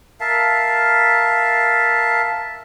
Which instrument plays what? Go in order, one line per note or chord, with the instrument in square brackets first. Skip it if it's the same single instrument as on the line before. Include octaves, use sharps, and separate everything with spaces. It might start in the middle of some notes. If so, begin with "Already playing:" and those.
[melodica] A#4 E5 F5 A5